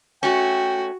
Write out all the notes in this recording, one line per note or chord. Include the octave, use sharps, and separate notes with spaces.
A3 C#4 F#4 G5